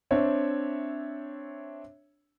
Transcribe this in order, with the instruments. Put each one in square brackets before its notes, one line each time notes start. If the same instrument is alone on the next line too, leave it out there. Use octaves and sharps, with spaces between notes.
[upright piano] C4 D4 C#5 E5